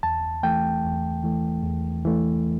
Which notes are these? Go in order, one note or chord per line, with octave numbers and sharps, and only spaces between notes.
E2 A5
E3 A3 G5
E2
E3 A3
E2
E3 A3